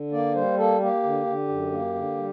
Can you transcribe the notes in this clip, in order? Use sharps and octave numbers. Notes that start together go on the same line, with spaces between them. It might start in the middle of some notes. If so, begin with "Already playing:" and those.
Already playing: D3
A#3 D5
G3 C5
A#3 A4
A#3 G4
D3
D3
F#2
A#3
D3
G3